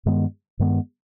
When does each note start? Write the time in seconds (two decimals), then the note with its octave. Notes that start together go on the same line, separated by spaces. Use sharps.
0.06 G2 D#3 G#3 B3
0.59 G2 D#3 G#3 B3